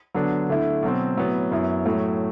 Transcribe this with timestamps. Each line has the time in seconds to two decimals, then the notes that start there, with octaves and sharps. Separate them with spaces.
0.14 D3 F#3 B3 D4
0.49 D3 A3 E4
0.83 B2 F#3 C4
1.17 A2 F#3 B3
1.52 F#2 F#3 B3 E4
1.85 A2 F#3 A3